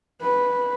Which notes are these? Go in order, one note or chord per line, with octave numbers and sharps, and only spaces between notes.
B4